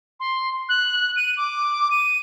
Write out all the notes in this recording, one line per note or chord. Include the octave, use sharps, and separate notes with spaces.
C6
F#6
D#7
D6
D#7